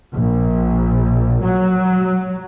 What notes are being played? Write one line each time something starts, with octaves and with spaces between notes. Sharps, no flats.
A#1
F#3